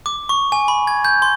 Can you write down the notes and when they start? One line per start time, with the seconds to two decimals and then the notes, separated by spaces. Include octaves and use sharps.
0.06 D6
0.29 C#6
0.52 G#5
0.68 B5
0.87 G#6
1.05 G6
1.22 C6